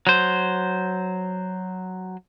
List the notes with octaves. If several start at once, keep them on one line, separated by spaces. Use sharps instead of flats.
F#3 C5